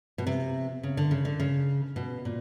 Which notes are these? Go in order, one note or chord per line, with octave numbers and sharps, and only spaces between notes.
B2
C3
C#3
D3
C#3
D3
C#3
B2
A#2